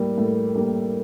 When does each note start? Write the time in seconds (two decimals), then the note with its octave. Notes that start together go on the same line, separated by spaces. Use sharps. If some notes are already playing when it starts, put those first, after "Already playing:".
Already playing: A2 G3 A#3 A#4
0.18 A2 A4
0.55 G3 A#3